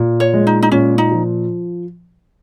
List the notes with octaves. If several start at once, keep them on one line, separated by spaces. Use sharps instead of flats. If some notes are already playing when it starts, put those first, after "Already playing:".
Already playing: A#2
C#5
G#3
D#4
D#4
A#2 C#4
D#4
F3